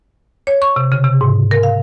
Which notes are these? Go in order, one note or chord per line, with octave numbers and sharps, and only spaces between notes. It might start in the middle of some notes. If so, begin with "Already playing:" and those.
C#5
C#6
C3
C#3
C3
G#2
A#4
F5